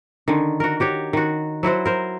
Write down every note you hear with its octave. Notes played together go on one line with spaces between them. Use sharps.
D3 D#3
F#4 A#4
F#4 G4 C#5
D#3 F#4
F#3 E4 F#4 C5
A#4 C5